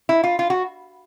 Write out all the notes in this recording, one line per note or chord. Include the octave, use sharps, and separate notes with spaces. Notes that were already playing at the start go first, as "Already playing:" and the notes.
E4
F4
F4
F#4